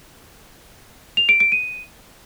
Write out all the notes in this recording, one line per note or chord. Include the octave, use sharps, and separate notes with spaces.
F7
D7
D7
D#7